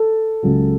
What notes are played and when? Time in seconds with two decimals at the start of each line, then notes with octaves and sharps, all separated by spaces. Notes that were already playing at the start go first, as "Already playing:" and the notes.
Already playing: A4
0.43 C#2 C#3 F#3